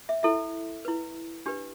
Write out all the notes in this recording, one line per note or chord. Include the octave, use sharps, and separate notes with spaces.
E5
E4 A4 E5
E4 B4
D4 G4 B4